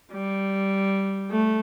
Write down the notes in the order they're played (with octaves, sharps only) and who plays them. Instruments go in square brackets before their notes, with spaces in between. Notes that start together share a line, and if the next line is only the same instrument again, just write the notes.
[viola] G3
A3